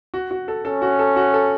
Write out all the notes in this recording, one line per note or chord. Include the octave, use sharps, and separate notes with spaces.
F#4
F#4
A4
C#4 A4
F#4
A4
F#4
A4